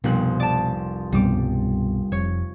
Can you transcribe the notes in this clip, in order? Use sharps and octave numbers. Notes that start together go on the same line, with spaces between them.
F1 C2 B2 F#6
D5 A5
C2 G2 B2 G3 D6
F1 C#5